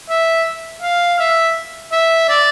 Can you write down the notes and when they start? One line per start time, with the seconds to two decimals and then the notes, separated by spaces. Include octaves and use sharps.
0.10 E5
0.82 F5
1.19 E5
1.92 E5
2.29 D5